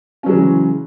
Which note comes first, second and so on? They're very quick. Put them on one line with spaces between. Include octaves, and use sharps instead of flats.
C#4 F#3 G#3 C#3 E3